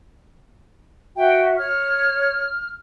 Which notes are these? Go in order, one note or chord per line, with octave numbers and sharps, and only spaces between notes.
F#4 E5 G5
C#5 F6